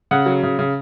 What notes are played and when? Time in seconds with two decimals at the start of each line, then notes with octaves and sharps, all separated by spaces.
0.11 C#3 F#5
0.26 F#3
0.43 C#3
0.59 C#3